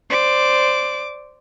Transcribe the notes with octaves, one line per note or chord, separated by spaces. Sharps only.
C5 D5 D6